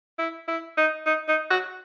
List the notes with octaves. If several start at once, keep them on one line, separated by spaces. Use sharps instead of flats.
E4
E4
D#4
D#4
D#4
F#4